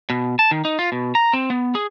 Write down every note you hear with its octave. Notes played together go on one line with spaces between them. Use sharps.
B2
A5
D#3
D#4
F4
B2
A#5
C4
B3
G#4